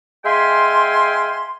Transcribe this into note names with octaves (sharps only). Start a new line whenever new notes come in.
G#3 E5 F5 G5 G#5 C6